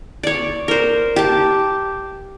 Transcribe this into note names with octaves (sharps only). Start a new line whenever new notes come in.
C#5 D5
A#4 C5
G4 A5